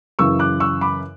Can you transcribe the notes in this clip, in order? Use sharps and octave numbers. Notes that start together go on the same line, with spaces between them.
F#2 C#3 E3 C#6 E6
D6 F#6
C#6 E6
B5 D6